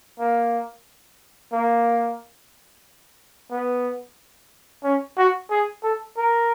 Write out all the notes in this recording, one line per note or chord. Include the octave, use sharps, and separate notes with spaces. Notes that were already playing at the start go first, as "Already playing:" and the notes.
A#3
A#3
B3
C#4
F#4
G#4
A4
A#4